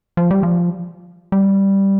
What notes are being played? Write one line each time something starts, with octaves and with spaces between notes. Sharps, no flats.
F3
G3
F3
G3